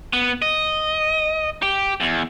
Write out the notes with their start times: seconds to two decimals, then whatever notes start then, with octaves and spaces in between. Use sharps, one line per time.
0.13 B3
0.42 D#5
1.63 G4
2.00 E2